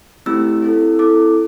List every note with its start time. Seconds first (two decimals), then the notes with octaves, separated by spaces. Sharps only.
0.26 A3 C4 E4 G4 E6
0.62 C4 E4 A4
0.99 C4 E4 A4 D6